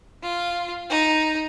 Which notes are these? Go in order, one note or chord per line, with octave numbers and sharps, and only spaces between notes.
F4
D#4